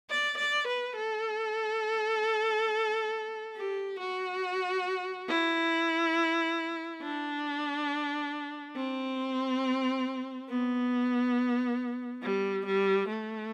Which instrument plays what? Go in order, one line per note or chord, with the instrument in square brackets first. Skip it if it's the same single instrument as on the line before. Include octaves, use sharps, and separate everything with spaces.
[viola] D5
D5
B4
A4
G4
F#4
E4
D4
C4
B3
G3
G3
A3